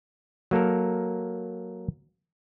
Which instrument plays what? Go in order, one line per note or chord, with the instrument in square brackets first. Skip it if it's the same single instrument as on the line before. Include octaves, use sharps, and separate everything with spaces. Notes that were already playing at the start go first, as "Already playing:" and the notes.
[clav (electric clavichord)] F#3 A#3 A4 A#4